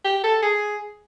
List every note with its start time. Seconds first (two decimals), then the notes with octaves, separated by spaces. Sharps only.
0.05 G4
0.24 A4
0.43 G#4